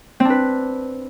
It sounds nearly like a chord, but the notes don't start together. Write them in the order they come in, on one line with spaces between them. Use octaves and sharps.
C4 D4 B4